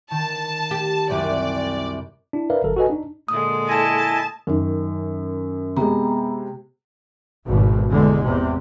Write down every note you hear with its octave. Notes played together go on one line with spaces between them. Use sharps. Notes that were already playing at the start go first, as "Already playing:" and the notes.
D#3 A5
G4
C2 F#2 C3 D5
D4 E4
A#4 B4 D5 E5 F5
G1 F#3 A4 A#4
F#4 G4 A4 B4 D#5 G#5
D4 D#4
A#2 D3 G#3 D#6
E4 D#5 G#5 A5
F#2 D#3
C3 G#3 B3 A#5
G#1 B2
E2 D3 G#3
E2 C3